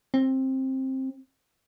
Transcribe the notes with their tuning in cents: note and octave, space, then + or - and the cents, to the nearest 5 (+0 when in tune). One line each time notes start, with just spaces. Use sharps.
C4 +15